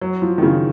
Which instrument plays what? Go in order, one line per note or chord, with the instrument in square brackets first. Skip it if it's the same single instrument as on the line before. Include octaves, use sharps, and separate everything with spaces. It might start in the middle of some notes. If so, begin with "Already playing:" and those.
[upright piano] F#3
F3
D#3
C#3